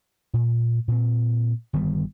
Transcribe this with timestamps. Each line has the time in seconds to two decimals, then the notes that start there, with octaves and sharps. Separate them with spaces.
0.34 A#2
0.88 A#2 C4
1.73 G1 D#3 G3 B3